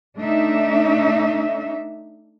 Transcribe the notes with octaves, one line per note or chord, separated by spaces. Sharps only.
A3 D4 D#4 E5